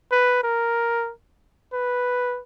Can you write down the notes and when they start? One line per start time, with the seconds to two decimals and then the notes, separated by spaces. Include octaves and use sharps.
0.12 B4
0.44 A#4
1.73 B4